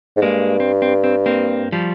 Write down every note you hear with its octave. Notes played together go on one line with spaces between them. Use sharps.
G#2
G2 G#3 A#3
C4
C4
C4
A#3 C4
F3 G3